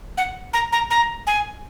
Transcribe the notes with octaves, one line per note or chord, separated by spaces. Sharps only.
F#5
A#5
A#5
A#5
G#5